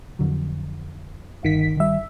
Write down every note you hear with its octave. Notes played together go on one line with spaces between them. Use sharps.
F2 D3 F#3
G1 D#3 B6
G1 D#3 G3 E5